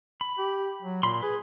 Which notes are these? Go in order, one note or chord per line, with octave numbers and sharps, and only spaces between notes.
B5
G4
F#3
A#2 B5 C6
G#4 B4